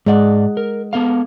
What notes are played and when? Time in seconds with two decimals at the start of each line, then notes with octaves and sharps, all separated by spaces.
0.06 G#2 G#3 D5 D#5 F#5
0.57 A#4
0.93 B3 A4 F5